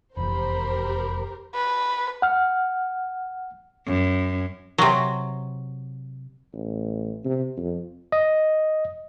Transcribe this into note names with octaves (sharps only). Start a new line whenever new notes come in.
F1 E2 G4 A#4 C5 B5
B4
F#5 F6
F#2
C3 F#3
A1
C3
F2
D#5